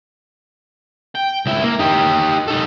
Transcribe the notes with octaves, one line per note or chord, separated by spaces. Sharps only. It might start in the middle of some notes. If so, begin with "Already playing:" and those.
G5
C#2 E4
A#3
D#4 G4
D#4 A4